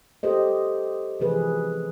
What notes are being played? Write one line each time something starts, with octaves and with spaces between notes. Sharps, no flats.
G4 A4 C5 D#5
C3 E3 F3 G#4 B4